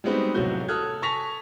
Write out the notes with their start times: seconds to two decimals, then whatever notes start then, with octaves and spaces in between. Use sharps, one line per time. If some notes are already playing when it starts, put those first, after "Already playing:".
0.04 G3 G#3 B3 C4 D#4 F#4
0.34 F1 A2 F#3 F#4 G6
0.68 A4 D#6 F6 F#6 G#6
1.02 G#5 A5 C#6 A#6 B6 F7